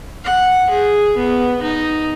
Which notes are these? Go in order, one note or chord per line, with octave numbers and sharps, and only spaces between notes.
F#5
G#4
B3
D#4